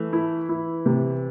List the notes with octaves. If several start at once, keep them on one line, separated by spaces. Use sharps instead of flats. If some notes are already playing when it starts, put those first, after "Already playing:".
Already playing: E3 A3
E4
E4
C3